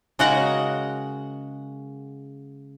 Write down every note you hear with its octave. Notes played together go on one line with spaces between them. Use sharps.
C#3 G#3 F#4 A#4 D#5 F#5